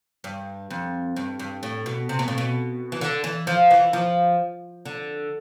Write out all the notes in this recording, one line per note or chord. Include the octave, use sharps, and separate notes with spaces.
G2
F2
G2
G2
A2
B2
C3
B2
A2
B2
E3
D3
E3
F3
E3
F3
D3